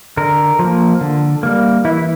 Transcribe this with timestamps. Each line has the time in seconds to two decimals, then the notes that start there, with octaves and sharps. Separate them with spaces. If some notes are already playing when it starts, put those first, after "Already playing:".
0.17 D3 A#4
0.59 F3 A#3
1.01 D3
1.43 G3 A#3
1.85 E3 E4